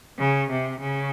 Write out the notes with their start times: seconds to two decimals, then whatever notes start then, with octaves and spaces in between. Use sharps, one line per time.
0.19 C#3
0.50 C3
0.80 C#3